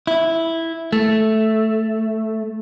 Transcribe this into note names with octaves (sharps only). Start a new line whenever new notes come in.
E4
A3